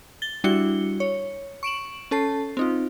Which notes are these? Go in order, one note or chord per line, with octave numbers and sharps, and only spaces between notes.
A6 G7
G3 D4 E4 F#4 C#7 G7
C#5
C#6 D7 E7 F#7
C#4 A4 A5 C7
C4 D#4 F4